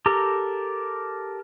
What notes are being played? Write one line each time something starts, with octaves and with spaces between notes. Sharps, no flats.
G4 A4 A#4 A#5